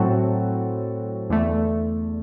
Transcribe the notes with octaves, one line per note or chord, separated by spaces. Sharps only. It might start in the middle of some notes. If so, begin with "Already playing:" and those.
Already playing: A2 F#3 C4 F#4 A4
E2 D3 A3